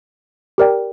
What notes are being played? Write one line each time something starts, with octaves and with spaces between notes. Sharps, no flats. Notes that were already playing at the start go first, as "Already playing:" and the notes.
G4 A#4 D5 G5